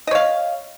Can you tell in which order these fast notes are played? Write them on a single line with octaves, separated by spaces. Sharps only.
D#5 C#5 F5